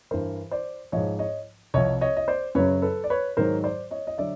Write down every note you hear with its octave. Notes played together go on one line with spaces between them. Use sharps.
G2 E3 A#4 C5
C5 D5
G#2 F3 C#5 D#5
C#5 D#5
C2 C3 F3 C#5 D#5
C#5 D#5
D#5
C5 D5
F#2 C#3 F#3 B4 C#5
A4 B4
D5
B4 C#5
G#2 D#3 F#3 A#4 C5
C5 D5
C#5 D#5
D#5
D3 F#3 D5 E5